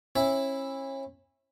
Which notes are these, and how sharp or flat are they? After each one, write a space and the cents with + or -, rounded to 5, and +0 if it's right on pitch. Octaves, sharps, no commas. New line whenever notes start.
C#4 -35 E4 +0 E5 +0